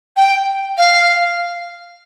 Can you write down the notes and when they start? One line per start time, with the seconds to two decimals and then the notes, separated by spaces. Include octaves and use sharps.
0.16 G5
0.77 F5